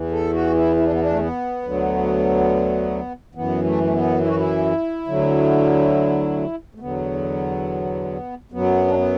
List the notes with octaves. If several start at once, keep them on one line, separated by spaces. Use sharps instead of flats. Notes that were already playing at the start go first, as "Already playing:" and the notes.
Already playing: E2 E3
A4
F#4
E4
E4
D4
B3
D4
A3
B3
D2 D3 F#3
F#2 E3 B3
A3
A3
B3
E4
F#4
E4
D2 D3 F#3
A3
E2 D3 F#3 B3
F#2 F#3 B3
D4
B3